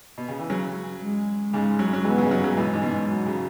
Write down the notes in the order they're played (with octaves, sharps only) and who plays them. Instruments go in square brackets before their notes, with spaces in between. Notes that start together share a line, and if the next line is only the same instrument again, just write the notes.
[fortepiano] B2
C#3
E3
C#3 F#3
[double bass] G#3
[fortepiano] G#2 C#3 [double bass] G#3
[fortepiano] C#3 F#3
F#3
[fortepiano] E3 G#3 [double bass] B3
[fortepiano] C#3 F#3
G#3
C#3 F#3
C#3 F#3
[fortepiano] B2 E3 [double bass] G#3
[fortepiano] G#2
B2
[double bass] F#3
[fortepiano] C#3